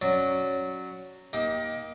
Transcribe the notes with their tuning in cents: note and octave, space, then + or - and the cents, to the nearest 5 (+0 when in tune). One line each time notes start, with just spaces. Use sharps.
F#3 +0 C#4 +0 D5 +0
A#3 +20 D#4 +25 G4 +0